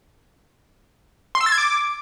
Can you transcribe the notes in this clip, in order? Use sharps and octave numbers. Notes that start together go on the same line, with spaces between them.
C6
E6
A6
G#6
D6